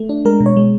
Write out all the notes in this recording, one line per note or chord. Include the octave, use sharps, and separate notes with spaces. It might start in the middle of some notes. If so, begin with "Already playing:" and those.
Already playing: A3
D4
G#3 A#4
B2
C#5
G#3